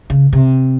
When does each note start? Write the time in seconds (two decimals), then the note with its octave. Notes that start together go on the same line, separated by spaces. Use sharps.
0.10 C#3
0.33 C3